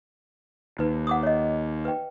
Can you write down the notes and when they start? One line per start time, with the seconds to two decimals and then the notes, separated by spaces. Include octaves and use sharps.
0.79 D#2 D#4 B4
1.07 F#5 D6 D#6
1.23 C#5 D#5
1.85 B4 G5